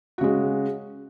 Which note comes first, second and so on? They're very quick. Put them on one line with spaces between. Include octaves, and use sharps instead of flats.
F#4 C#3 G#3